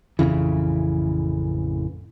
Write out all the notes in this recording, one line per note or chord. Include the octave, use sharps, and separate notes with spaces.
A1 F2 C#3 E3